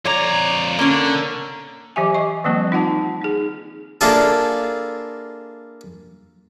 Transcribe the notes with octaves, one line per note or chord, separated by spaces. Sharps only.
F2 C#5 D5 A#5
D3 A#3 C#4
E3 F#3 G4 E5 G#5
D#5 C#6 D6
D#3 F3 G3 A#3 C4
D#4 F4 F#5 A5
D#4 G#4
A#3 D4 E4 F4 G#4 A4